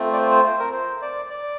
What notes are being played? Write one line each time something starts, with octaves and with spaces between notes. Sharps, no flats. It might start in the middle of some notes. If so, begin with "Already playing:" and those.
Already playing: A3 C4 F4
D5
C5
C5
C5
A#4
C5
D5
D5